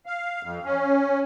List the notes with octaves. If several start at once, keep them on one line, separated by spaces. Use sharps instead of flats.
F5
F2
C#4